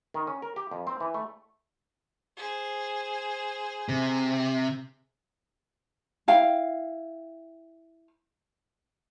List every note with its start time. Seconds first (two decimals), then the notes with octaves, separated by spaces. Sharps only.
0.14 D#3
0.27 C#4
0.42 A#4
0.56 G4
0.71 F2
0.87 C4
1.00 E3
1.14 A3
2.37 G#4 C5
3.89 C3
6.28 E4 F5 G5